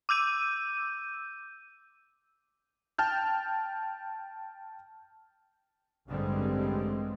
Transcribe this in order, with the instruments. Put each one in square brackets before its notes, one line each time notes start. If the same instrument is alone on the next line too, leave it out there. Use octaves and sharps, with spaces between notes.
[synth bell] D6 E6 G6 D#7
[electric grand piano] G5 A5 F6 G6
[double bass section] A1 G2 D3 G3 G#3 C4